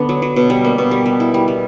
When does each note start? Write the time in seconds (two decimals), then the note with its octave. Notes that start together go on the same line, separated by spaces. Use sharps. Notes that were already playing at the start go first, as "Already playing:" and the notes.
Already playing: D3 B3 D4
0.09 F#3
0.22 F#3
0.36 B2
0.50 G3
0.65 A#3
0.78 B2
0.91 G3
1.06 G3
1.20 E4
1.34 G3
1.48 G3